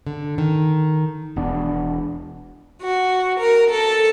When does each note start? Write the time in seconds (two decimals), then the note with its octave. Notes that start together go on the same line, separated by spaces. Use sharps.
0.07 D3
0.38 D#3
1.36 E1 B3 D4
2.81 F#4
3.39 A#4
3.69 A4